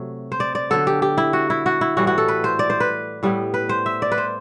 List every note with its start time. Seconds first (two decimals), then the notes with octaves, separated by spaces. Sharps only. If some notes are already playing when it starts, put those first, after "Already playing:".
Already playing: C3 F#3 A3
0.32 C5
0.40 D5
0.55 D5
0.70 D3 F#3 B3 A4
0.87 G4
1.02 G4
1.18 E4
1.33 F#4
1.50 E4
1.66 F#4
1.81 E4
1.97 A2 E3 G3 F#4
2.07 F#4
2.18 A4
2.28 B4
2.44 C5
2.59 D5
2.70 C5
2.80 B4
3.23 A2 G3 B3 E4
3.54 B4
3.69 C5
3.86 E5
4.02 D5
4.12 B4
4.18 C5